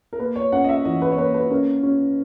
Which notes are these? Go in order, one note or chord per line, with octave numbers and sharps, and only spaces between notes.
A#4
A#3 B4
C#5
C#4 F#5
D#5
E5
E3 D#5
B4
C#5
A#3 B4
B4
C#4 A#4
C#4